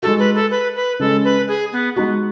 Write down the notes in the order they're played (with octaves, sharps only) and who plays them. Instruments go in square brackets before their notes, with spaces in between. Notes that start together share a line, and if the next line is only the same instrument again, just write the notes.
[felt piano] G#3 D#4 F#4 [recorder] A4
[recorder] B4
A4
B4
B4
[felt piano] C#3 G#3 C#4 [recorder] A4
[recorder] B4
G#4
B3
[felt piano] G#3 D#4 F#4 [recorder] B3